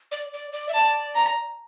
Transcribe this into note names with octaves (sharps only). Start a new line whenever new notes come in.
D5
D5
D5
E5
D5 A5
A#5